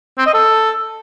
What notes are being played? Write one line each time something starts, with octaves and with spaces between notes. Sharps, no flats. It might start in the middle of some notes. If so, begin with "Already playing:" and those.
C4
D#5
A4